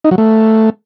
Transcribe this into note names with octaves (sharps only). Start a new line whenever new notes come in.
D#4
F#3
A3